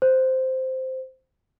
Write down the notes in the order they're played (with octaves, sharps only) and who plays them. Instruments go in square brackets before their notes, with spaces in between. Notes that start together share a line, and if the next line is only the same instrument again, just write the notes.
[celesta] C5